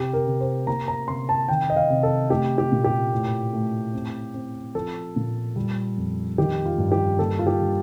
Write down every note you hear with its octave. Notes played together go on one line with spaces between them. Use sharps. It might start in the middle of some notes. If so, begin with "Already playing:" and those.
Already playing: C3 G4
A#4
C3
C5
A#3 A#5
A#5
C3 C6
A5
D#3 G5
D#5
F5
C3
A4
A3 G4
G4
A#2
G4
A2
A3
C4
C4
F3 A4
A#2
G3
F2
D#3 G4
F4
G2
G4
A#3 A4
F4
G4
G3